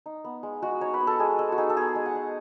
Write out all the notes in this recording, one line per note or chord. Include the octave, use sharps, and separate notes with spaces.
D#4
B3
G#3
G#3 F#4
D#4 C#5
B4
B3
A4
G#3 G#4
G#3 A4
F#4
D#4 G#4
A4
B3 G#4
G#3
F#5
G#3